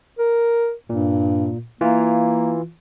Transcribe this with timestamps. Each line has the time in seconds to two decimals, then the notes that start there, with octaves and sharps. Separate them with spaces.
0.19 A#4
0.90 G2 A#2
1.81 E3 A#3 F4